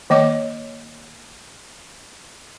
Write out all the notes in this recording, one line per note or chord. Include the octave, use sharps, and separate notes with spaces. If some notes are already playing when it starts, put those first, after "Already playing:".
D#3 A#3 C#5 D#5 D6